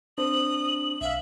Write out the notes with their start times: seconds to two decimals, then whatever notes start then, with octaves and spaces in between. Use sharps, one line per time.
0.18 C4 D4 D#6 F#7
1.01 B1 E5 F5